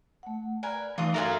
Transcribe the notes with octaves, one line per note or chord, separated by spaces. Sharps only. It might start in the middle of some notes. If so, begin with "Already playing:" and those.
A3 F#5
A#4 B4 D5 G#5
E3 A3 D#4 F4 D5 D#6
F#4 A4 A#4 E5 F5 G#5 A#5 C6